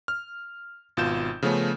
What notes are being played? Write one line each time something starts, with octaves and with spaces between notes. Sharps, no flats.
F6
G#1 B2 F4 G6 E7
C#3 F3 A3 B3 C#4